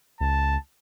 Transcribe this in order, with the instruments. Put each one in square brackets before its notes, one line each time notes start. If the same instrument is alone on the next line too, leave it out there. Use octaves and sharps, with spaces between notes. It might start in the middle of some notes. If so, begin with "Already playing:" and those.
[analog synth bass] C#2 [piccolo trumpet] A5